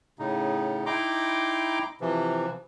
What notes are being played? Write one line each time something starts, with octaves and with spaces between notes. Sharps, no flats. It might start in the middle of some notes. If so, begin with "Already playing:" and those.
A2 C#3 D#4
D#4 E4 G5 A#5 C6 D6
C3 E3 F3